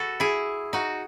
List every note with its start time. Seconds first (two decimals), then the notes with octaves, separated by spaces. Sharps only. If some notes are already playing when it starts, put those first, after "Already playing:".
Already playing: F#4 A4 B4
0.20 E4 G#4
0.73 D#4 F#4